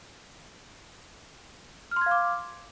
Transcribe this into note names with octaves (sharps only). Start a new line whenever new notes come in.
F5 C6 D6 F6 G#6